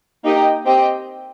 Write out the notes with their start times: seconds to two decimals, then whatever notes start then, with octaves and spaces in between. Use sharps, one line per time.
0.25 A#3 D#4 G4 D#5 G5
0.65 C4 G4 D#5 G5